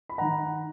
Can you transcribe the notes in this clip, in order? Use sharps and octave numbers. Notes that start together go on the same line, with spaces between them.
B5
D#3 F#5 A#5